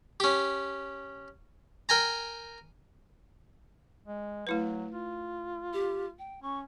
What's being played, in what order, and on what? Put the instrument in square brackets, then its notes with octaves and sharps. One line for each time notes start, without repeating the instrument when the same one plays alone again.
[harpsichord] C#4 G4
A#4 G5 G#5 A#5
[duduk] G#3
[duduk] F#3 [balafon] A3 E4 B4
[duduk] F4
[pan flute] G4
G5
[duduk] C#4 [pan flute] C#6